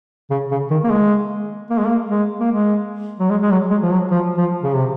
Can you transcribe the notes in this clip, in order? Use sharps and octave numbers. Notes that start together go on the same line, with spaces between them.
C#3
C#3
D#3
A#3
G#3
A#3
G#3
A#3
G#3
A#3
G#3
F#3
G#3
G#3
F#3
G#3
F3
F#3
F3
F3
C#3
C3